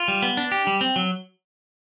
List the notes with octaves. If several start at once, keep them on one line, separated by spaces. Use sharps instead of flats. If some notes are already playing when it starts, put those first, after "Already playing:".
Already playing: F4
G3
B3
D4
G4
G3
C4
F#3